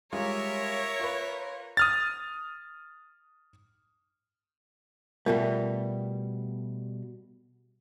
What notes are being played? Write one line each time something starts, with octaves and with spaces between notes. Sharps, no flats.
G3 G#3 F4 A#4 C#5 E5 C#6
F4 B4
D#6 F6 A6
B2 G3 A3 B3 F4 A#4